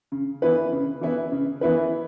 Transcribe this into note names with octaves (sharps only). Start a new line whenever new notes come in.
C#3
E3 B3 E4 B4
C#3
E3 B3 E4 B4
C#3
E3 B3 E4 B4